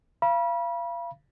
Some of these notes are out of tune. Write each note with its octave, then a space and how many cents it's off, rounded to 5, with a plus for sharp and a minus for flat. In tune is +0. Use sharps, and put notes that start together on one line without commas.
F5 -30 B5 -35